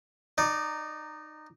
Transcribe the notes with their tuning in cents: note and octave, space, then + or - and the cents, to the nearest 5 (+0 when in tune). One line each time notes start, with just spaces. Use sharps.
D#4 -15 D5 +0